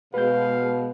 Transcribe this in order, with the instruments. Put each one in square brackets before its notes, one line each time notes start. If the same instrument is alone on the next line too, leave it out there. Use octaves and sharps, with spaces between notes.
[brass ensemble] B2 [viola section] G#3 [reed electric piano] B4 G6 [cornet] F5